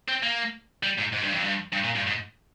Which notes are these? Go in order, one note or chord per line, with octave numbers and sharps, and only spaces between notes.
C4
A#3
G3
G#2
G#2
G2
F2
G2
G2
A#2
G2
G#2